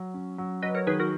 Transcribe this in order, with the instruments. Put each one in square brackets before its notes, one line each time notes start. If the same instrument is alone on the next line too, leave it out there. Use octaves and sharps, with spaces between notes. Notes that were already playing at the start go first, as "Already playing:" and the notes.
Already playing: [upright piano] F#3
C#4
F#3
[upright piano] F#3 [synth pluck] B4 D#5
[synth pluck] A#4 C#5
[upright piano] D#3 [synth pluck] G#4 B4
[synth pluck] F#4 A#4